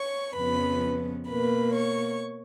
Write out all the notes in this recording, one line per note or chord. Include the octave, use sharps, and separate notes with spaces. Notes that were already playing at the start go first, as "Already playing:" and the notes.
Already playing: C#5 C#6
F2 C#3 F3 B3 B4 B5
B2 A#3 B4 B5
C#5 C#6